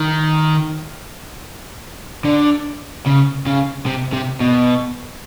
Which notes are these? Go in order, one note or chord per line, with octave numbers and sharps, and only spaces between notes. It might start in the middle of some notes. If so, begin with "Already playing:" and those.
Already playing: D#3
D3
C#3
C#3
C3
C3
B2